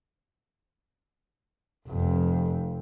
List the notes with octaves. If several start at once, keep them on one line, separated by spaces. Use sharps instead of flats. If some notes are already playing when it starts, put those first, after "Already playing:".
F1 F2